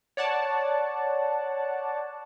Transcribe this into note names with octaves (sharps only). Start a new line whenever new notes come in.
C#5 D5 F#5 A5